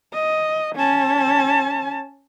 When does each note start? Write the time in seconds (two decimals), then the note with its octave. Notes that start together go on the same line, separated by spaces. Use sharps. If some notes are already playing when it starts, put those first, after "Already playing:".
0.13 D#5
0.75 C#4 A5